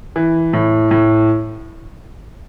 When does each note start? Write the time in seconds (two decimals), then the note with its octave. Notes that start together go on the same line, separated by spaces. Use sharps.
0.16 E3
0.53 A2
0.91 A2